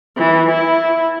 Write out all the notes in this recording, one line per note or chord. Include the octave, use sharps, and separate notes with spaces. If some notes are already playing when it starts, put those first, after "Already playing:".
E3
E4